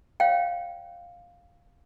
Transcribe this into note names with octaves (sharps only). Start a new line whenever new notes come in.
C#5 F5 G5